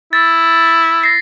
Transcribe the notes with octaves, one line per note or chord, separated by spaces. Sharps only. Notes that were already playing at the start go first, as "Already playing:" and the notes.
E4 A6
A#6 C7